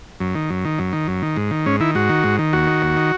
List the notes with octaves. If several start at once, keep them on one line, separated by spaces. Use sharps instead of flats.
F#2
D#3
F#2
D#3
F#2
D#3
F#2
D#3
G#2
D#3
G#2 C#4
D#3 E4
G#2 F#4
D#3
G#2
D#3
D#2 F#4
D#3
D#2
D#3